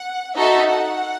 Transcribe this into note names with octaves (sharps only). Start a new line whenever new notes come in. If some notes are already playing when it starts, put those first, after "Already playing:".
Already playing: F#5
D#4 F#4 A4 E5
F#5